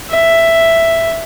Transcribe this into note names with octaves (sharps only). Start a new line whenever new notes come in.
E5